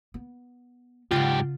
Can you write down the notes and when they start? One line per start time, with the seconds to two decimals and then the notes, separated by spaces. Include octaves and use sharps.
0.14 B3
1.11 G#2 C#3 F4 G4 F#5